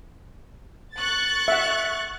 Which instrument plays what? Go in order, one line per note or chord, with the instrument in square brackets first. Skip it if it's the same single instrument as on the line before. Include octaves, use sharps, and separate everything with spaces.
[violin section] C#6 F#6 A6
[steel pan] E5 F#5